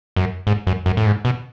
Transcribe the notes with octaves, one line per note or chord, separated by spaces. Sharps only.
F#2
G#2
F#2
F#2
A2
G#2
B2